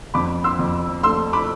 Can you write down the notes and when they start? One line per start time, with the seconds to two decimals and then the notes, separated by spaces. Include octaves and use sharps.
0.14 F2 B5 D6
0.44 C6 E6
0.59 F2
1.03 A3 C6 E6
1.33 B5 D6